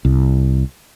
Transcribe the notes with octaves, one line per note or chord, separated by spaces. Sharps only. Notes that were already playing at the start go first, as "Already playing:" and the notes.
C2